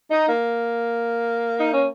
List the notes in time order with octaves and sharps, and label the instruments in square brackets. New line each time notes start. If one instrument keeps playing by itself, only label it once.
[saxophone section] D#4
A#3
D#4
C#4